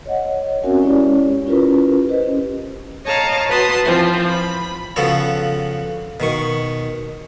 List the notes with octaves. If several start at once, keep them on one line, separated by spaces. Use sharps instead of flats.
C#5 D#5 F#5
C4 C#4 F#4 A#4 E5 G#5
G#3 C#4 E4 G4 C#5 D5
C#4 E4 F4 G4 A#4 B4
G4 B4 C5 D#5
C#4
C#5 D#5 F5 A5 A#5
F#4 B4 A5 C6 D#6
E3 F3 C4 F4
B5
C#3 F3 B3 F#4 A4
B2 D#3 C#6